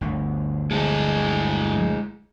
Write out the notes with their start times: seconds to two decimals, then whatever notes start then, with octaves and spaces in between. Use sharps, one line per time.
0.01 G1 D2
0.71 G2 G#3 E4 G#4 A4